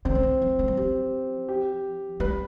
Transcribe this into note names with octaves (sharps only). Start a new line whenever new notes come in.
D3 C4
D3
E3
F3
A3
G3
F3 G4
G4
G3 B4